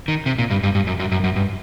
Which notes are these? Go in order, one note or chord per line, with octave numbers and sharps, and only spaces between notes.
D#3
C3
A#2
G2
G2
G2
F#2
F#2
F#2
F#2
G2